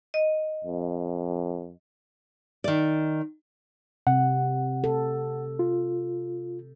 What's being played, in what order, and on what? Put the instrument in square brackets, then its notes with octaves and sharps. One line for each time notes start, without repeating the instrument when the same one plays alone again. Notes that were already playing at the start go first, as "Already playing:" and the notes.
[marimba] D#5
[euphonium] F2
[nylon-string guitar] D#3 D5
[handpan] C3 [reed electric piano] F#5
[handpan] A4
[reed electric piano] F4